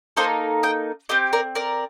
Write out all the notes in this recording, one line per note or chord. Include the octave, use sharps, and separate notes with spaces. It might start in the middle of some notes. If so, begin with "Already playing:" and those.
A#3 D#4 A4 C5 D#5
D#5 G5
C4 G4 C5 D#5
A#4 D5
A#4 D5